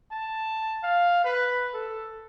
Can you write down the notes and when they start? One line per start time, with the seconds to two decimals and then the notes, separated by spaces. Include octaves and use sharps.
0.11 A5
0.83 F5
1.24 B4
1.74 A4